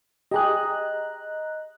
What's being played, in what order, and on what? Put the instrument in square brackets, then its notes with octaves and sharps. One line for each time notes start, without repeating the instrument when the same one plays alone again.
[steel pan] G4 G#4 [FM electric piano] D#5 A#5 F#6